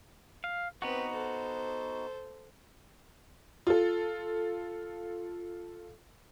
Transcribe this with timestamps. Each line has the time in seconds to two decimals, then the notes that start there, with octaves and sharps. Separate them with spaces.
0.44 F5
0.82 B3 C4 D#4 F#4 B4
1.11 A4 C5
3.67 F4 A4